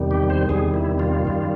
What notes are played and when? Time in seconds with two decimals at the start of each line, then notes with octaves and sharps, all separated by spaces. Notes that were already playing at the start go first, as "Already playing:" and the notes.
Already playing: E2 C3 D#3 G3
0.11 G4
0.30 C5
0.49 E2 C3 D#3 G3 G#4
0.74 E4
0.99 F4
1.25 F#2 D#3 G3